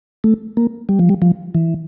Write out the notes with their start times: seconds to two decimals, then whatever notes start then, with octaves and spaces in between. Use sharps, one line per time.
0.24 A3
0.57 A#3
0.89 G3
0.99 F3
1.09 G3
1.22 F3
1.55 E3